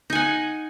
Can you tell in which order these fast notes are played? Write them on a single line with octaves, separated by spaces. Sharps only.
D#4 G#5 F#5